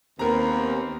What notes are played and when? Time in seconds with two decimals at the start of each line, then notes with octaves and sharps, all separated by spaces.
0.19 D#2 B3 C4 A#4 A#5